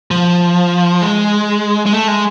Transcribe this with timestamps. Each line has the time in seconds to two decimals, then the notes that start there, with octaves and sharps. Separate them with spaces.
0.11 F3
1.02 G#3
1.86 G#3
1.93 A3
2.08 G#3